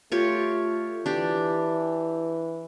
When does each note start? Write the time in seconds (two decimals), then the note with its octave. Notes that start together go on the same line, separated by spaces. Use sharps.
0.12 A3 F4 G4 C#5
1.06 E3 D4 G4